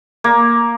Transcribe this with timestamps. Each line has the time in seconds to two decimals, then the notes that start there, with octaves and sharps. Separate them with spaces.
0.24 A#3